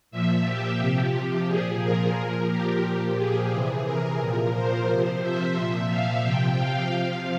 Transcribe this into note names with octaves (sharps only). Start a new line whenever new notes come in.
A#2 F3 E5
G4
C3 F3
G4
A#2 F3 G#4
A#4
A#2 F3
G4
A#2 F3
G#4
C3 E3 G#4
A#4
A#2 F3 A#4
C5
C3 F3
E5
A#2 F3 E5
F5
C3 F3 G5
F5
C3 F3 F5